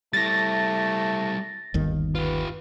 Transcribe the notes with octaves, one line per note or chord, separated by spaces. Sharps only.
G3 A3 E4 A6 A#6
G1 D#2 D#3
F4 G4 B4